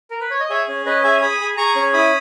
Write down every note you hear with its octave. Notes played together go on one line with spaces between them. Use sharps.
A#4
B4
C#5
D#5
G#4 C#5 E5
C#4
C#4 B4 D#5
G#4 E5 G#5
G#4 B5 D#6
G#4
G#4 A#5 C#6
C#4
E4 B5 D#6